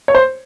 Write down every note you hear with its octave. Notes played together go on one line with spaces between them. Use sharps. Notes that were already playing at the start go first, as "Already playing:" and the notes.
C#5
C5